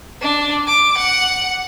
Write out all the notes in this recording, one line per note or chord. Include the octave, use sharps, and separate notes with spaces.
D4
D6
F#5